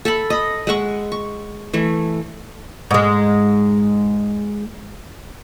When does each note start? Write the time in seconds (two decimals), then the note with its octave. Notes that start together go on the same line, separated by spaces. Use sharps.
0.05 A4 E5 A5 B5
0.30 D#5 B5
0.67 G#3 E5 F#5 C#6
1.12 C#6
1.73 E3 A3
2.91 G#2 G#3